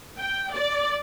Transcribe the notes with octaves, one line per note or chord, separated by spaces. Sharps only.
G5
D5